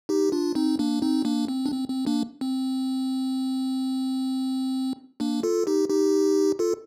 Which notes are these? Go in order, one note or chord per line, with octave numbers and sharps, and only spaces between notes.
D#4 G4
D4 F4
C4 D#4
A#3 D4
C4 D#4
A#3 D4
C4
D4
C4
C4
A#3 D4
C4
A#3 D4
F4 A4
D#4 G4
D#4 G4
F4 A4